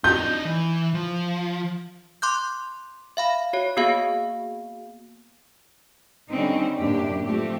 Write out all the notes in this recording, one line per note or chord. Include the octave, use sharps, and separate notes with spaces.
D4 D#4 G6
E3
F3
C6 D6 F#6 G6
E5 F5 B5
F#4 C#5
A#3 B3 F#4 G#4 F5
D3 G3 C4 C#4 D#4
F#2 A2 C3 A#3 D4 G4
F3 A3 C4 G4